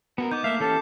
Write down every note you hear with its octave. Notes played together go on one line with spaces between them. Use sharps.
B3 F#4 A4 A#4
B3 D#4 D6 G6
A3 A#3 E5 F5 C7
E3 C#4 G4 A4